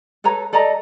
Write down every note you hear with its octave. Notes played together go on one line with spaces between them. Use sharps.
A4 B4 C#5 A#5
A4 D5 D#5 A#5